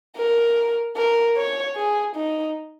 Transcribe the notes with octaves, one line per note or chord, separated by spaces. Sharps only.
A#4
A#4
C#5
G#4
D#4